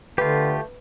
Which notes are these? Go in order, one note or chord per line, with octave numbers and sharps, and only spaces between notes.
D3 A3 F4 G4 B4